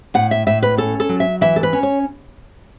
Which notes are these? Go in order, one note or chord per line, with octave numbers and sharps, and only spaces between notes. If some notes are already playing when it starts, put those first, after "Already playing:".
A2 F#5
E5
A2 E5
B4
C#4 A4
A4
F#3
E5
E3 E5
A4
B4
C#4
C#5